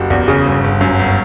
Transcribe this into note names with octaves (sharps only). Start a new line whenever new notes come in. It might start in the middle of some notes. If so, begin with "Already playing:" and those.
Already playing: F#1 F#4 G4
E2
C#3 G#4
G1
G1
F#2
G1